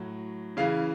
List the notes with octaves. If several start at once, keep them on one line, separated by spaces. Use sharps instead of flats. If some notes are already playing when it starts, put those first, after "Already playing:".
Already playing: A2 F#3
C#3 E3 F5